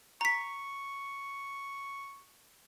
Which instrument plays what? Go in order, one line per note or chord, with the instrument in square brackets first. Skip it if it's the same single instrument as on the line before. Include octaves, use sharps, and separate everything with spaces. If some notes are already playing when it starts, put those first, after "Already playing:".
[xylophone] A#5 B6 [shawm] C#6